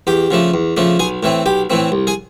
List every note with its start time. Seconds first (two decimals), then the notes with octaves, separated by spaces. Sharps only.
0.07 E2 G4 G5
0.31 C#3 F3 A3 D4
0.54 E2
0.77 C#3 F3 A3 D4
0.99 B1 G#4 G#5
1.23 A2 E3 A3 C4
1.46 B1 G4 G5
1.70 A2 E3 A3 C4
1.92 C2
2.07 G#4 G#5